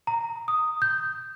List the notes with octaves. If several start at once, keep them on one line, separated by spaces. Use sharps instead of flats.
A#5
D#6
G6